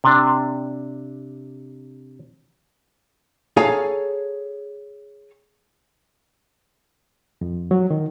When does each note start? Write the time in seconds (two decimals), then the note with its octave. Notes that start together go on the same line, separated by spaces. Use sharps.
0.04 C3 D4
3.57 G#4 A4 C#5 F5 G#5 A#5
7.41 F2
7.71 F#3
7.91 D#3